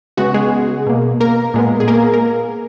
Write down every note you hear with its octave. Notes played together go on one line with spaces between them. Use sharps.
C#3 G#3 B3 F#4
G#3 G#4
B2 A#3
A#3 A#4
A#2 G#3 B3
G#4
A#3 A#4
A#4